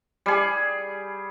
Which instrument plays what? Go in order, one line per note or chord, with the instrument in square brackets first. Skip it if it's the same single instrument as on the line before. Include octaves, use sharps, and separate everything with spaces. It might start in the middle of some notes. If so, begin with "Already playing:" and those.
[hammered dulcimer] G3 G#4